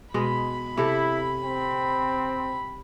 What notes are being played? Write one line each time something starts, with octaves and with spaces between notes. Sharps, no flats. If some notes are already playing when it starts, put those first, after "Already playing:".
B2 G#3 D#5 B5
C3 E4 A4
C4